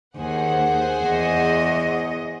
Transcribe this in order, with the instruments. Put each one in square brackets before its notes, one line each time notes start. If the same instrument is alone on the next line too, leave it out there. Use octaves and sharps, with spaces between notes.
[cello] D#2 [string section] G#4 C5 F#5
[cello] E2 D#5